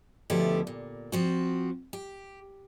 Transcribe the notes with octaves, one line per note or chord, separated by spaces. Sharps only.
D2 B2 F3 E4 G4 A4
A#2
F3 C4 F#4
G4